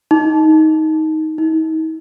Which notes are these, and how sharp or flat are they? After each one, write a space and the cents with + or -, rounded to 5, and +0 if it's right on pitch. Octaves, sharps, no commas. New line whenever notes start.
D#4 +15
D#4 +40